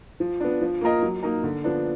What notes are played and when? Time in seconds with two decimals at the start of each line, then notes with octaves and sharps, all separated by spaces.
0.20 F3
0.40 B3 D4
0.61 F3
0.81 A#3 F4 A#4 D#5
1.03 F#3
1.23 A#3 D#4 A#4
1.43 D3
1.64 F3 B3 D4